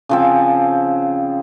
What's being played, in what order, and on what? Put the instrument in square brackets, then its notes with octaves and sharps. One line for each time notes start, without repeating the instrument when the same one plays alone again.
[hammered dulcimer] C#3 F3 C4